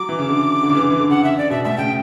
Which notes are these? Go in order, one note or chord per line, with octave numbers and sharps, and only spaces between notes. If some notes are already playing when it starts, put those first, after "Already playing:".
Already playing: F#3 D6
E3
C#3
D3
D3
C#3
E3
D3
E3
D3
C#3 F#5
E5
D5
B2 E5
A2 E5
C#3 G5